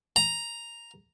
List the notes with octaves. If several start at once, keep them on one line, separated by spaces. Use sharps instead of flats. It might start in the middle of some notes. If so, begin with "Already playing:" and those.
A#5